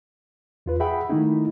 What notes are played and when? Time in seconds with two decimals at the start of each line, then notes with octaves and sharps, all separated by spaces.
0.66 E2 F4 B4
0.80 G#4 E5 F#5 G5 B5
1.09 D#3 A3 A#3 D#4 E4